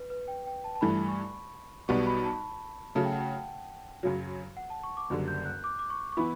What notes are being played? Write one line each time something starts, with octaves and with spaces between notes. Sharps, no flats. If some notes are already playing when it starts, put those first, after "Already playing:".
Already playing: B4
B4
G5
G5
A5
A5
G2 E3 A3 B5
C#6
B1 B2 G3 B3 C#6
B5
A5
C#3 F#3 A3 A5
G5
F#5
G5
F#2 C#3 F#3
F#5
A5
C#6
D6
F#1 F#2 D3 G3
G6
F#6
D6
D6
C#6
C#6
E3 B3 E4 B5